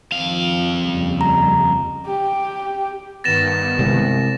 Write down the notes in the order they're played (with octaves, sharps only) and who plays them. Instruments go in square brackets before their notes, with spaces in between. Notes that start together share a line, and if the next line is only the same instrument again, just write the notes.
[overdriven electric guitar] F2 F5 [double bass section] D#3 F3
[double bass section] D#2 C#3 G3
[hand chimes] A#5
[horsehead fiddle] G4 G5
[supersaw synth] G2 D#3 B3 [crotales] A6 A#6 E7
[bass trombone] C2 [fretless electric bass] C3 G#3